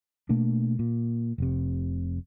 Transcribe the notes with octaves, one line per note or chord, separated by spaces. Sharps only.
B2 A3 A#3 D4
A#2
F1 C3